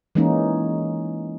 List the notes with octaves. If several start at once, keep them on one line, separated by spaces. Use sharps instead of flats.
E3 G#3 A#3 C#4 D#4